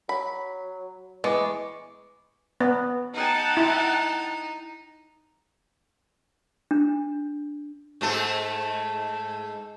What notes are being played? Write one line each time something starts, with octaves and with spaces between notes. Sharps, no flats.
F#3 B5
E3 G#3 B3 C#6 D6
B3
D#4 F#5 G5 A5
E4
D4
G#2 A3 A4